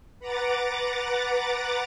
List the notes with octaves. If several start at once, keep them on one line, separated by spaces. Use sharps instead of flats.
B4 F#5 A#5 D6 A6